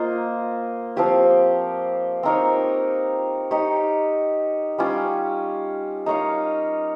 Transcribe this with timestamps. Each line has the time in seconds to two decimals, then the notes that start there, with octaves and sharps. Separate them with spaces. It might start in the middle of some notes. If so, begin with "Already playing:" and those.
Already playing: A#3 F4 C5 D#5
0.96 F3 C4 G4 C#5
2.23 C4 D#4 A#4 C#5
3.51 D#4 G4 C#5
4.78 G3 C#4 F4
6.06 D#4 A#4 C#5 F5